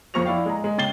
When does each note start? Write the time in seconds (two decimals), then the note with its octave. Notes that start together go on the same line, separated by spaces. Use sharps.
0.14 F2 F3 C#6 A#6 F7
0.25 E4 D5 F5 G5
0.46 G#3 A#5
0.64 G#3
0.78 C#3 G5 A6 C7 G7